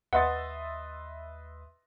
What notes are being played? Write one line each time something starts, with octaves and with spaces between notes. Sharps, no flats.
D#2 B4 D#5 E5 F#5 C6 A6